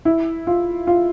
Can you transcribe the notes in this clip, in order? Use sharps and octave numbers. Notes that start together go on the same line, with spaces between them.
E4
F4
F4